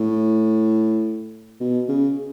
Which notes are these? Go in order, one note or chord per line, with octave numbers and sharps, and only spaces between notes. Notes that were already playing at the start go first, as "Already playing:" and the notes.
Already playing: A2
B2
C#3